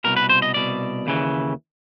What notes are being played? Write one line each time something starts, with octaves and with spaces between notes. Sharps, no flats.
C2 B2 A#4
B4
C5
D#5
C2 B2 D5
D#2 C#3 E3